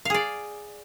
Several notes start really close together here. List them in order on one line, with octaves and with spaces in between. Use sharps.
F5 G#4 D5